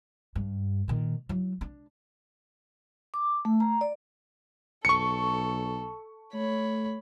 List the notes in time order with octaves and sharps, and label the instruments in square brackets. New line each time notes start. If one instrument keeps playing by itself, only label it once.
[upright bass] G2
A#2 D#3
F#3 E4
D4
[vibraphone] D6
A3
A#5
D5
[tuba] B1 [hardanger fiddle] A4 [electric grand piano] C#6 C#7
[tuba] A3 [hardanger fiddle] C#5 B5